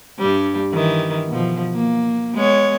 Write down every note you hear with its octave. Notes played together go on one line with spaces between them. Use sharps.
G2 G3
D#3 E3
B2 F3
A#3
G#3 B3 C#5